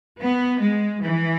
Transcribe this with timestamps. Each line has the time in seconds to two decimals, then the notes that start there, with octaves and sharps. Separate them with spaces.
0.19 B3
0.60 G#3
1.02 E3